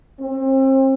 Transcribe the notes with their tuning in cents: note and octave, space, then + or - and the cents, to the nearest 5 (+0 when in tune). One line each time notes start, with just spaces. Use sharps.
C4 +35